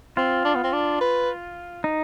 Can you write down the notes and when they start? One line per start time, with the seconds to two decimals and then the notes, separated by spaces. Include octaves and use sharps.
0.17 C4 F4
0.45 D4
0.55 B3
0.64 C4
0.73 D4
1.01 B4
1.84 D#4